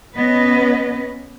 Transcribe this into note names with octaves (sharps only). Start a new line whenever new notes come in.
B3 C#4 B4 D#5